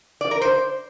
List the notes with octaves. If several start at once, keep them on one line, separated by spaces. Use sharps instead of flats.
D5
A#4
C5